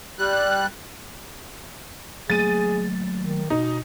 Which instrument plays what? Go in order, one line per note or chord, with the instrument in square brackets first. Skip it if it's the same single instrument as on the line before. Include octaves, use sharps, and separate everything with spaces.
[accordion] G3 F#6
[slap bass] F#3 A3 A#3 [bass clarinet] G#4 [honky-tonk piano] A6 D#7
[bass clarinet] D#3
[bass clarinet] B2 [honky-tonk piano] D#4